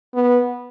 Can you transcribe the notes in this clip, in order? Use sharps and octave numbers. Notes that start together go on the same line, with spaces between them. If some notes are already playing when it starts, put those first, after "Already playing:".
B3